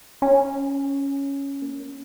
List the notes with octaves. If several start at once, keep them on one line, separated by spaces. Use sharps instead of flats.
C#4
A#3
C#4